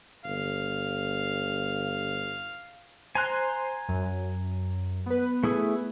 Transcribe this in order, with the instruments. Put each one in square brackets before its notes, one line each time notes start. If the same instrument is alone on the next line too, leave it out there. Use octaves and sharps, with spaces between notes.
[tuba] G1 [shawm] F5
[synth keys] C5 C6 [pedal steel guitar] G#5 A#5 F#6
[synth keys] F#2
B3 B4
[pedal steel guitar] A3 E4 G#4